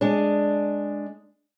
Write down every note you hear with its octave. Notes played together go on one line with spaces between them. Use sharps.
G#3 D4